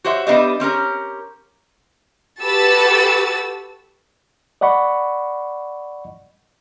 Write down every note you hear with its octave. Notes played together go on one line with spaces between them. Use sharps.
F#4 G4 C5 C#5 E5
G3 B3 D4 G4 D#5 E5
C4 C#4 G4 A#4
F#4 G4 A4 B4 E6 A6
D5 D#5 F#5 B5 C#6